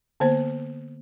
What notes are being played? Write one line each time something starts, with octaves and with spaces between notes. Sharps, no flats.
D3 A#3 B3 C5